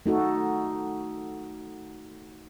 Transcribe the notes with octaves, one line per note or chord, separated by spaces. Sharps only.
A3 D#4 F#4 A4